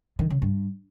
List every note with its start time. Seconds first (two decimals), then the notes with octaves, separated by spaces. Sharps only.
0.19 D#3
0.30 C#3
0.42 G2